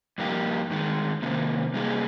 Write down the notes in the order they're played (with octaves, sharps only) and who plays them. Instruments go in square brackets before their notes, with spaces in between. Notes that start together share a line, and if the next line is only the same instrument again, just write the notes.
[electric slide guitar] G2 F3 A#3 D#4 G4
G2 D#3 G#3
C3 D#3 A#3 C#4
C3 G3 A#3 D#4 G#4